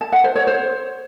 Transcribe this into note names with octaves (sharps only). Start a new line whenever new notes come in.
A5
F#5
C5
C#5
C5